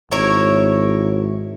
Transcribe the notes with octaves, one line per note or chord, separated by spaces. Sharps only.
G#1 E4 A#4 C#5